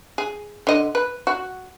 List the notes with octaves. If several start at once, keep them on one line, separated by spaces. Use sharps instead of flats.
G#4
D3 D#5
B4
F#4